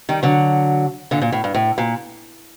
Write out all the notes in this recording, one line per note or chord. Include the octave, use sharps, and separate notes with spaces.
D#3 G3
D3 F#3
A#2 D3
A#2
A2
G2
A2
A#2